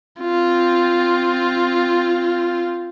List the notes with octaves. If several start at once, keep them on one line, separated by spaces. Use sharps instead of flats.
C4 F4